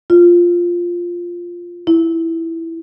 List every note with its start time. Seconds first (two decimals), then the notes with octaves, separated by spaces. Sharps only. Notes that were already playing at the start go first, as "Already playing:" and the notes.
0.10 F4
1.87 E4